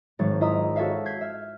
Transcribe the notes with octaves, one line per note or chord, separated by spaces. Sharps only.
G#1 F#3 C#5 A6
E4 F4 D#5 E5 A#5 D#6
F#4 A4 C#5 E5 F5
G6 G#6 B6 C7
E5 F6